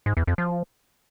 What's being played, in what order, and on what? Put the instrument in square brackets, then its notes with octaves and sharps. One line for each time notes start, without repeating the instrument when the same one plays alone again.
[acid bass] G#2
E2
F2
F3